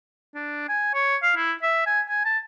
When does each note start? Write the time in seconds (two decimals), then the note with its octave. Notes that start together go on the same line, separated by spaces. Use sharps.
0.34 D4
0.68 G#5
0.94 C#5
1.22 F5
1.36 E4
1.62 E5
1.86 G#5
2.08 G#5
2.25 A5